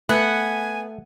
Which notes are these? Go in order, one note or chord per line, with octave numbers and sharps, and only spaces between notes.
A3 B3 F#5 G#5